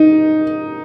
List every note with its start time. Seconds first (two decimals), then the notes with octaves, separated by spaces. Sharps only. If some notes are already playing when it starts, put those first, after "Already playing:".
Already playing: D#4